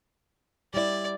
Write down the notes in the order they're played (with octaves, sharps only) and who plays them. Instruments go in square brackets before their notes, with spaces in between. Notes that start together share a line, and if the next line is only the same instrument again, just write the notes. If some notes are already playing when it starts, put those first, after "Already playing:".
[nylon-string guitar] G3 E4 [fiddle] D5